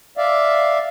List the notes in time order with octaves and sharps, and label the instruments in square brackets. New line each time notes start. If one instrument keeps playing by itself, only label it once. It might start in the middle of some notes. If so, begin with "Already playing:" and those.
[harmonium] D5 E5 F5